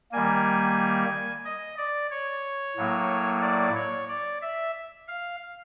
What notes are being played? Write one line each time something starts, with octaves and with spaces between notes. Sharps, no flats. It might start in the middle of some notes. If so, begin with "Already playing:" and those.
D#3 G3 A#3 G#5
D#5
D5
C#5
A2 F#3 A#3
D5
C#5
D5
E5
F5